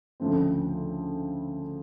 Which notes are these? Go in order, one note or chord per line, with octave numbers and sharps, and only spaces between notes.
D2 C#3 F3 A3 C4